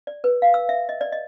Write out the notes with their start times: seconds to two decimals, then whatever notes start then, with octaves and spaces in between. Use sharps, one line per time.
0.07 D5
0.24 B4
0.42 F5
0.54 E6
0.69 E5
0.89 D#5
1.01 D5
1.12 D#5